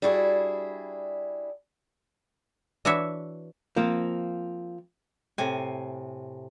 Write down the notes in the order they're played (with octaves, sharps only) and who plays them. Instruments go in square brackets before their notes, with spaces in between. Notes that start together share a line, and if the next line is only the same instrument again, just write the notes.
[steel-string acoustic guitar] G3 D4 E4 F#4 G#4
[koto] E3 D4 F#4 C#5 E5
[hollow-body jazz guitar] F3 A#3 C4
[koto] A2 C3 G#5